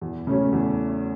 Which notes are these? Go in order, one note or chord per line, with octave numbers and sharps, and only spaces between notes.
E2
C#3 F#3 A3 C#4
E2